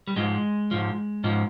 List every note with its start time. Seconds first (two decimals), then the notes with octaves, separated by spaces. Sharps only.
0.07 G3
0.16 G#2 F3 G#3
0.71 G#2 F3
1.24 G#2 F3